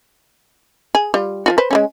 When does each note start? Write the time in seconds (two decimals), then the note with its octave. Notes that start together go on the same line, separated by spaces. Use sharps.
0.95 G#4
1.14 G3 F4
1.46 F3 F4 F#4
1.58 B4 C5
1.71 G#3 A3 C#4